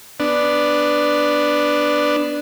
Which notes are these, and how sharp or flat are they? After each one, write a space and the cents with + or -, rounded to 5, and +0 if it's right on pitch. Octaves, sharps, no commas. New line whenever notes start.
B3 +0 D4 +0